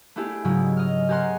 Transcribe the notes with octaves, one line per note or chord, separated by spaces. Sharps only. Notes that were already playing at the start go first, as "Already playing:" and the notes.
A3 B3 D4 E4 G4 G#4
G#2 C#3 F#3 G#3 E4
D#5 F6
G4 G#4 A#4 F#5 C6